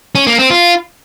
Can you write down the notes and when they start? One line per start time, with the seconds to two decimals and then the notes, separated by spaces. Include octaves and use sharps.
0.15 C#4
0.27 A#3
0.39 C4
0.50 F4